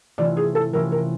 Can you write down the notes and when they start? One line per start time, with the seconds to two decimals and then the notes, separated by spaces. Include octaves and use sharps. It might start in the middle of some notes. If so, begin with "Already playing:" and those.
0.18 C3 E3 A3 C#4 F4 D5
0.37 G#4
0.55 A4
0.73 C3 E3 A3 C#4 F4 A#4
0.92 A#4